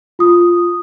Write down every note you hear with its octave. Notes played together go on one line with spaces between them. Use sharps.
F4 D#6